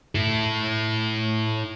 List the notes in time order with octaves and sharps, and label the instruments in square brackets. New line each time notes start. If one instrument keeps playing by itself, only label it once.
[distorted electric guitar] E4 A4